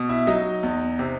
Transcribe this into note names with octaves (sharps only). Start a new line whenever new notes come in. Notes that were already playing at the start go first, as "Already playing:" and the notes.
Already playing: B2
E4 E5
F#3 D#4 D#5
E2
C3